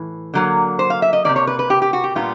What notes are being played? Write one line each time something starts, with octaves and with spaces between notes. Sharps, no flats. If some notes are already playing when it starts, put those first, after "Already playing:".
Already playing: A2 E3
D3 F#3 A#3
C5
F5
E5
D#5
C3 F3 A#3 D5
C#5
B4
B4
G4
G4
F#4
G4
A#2 G3 B3 D4 F4